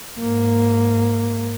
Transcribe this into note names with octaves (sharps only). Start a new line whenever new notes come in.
G#2 A#3